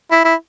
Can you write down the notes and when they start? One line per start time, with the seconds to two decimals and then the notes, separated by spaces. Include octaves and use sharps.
0.11 E4
0.25 E4